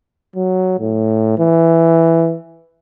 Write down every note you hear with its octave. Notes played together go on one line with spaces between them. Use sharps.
F#3
A2
E3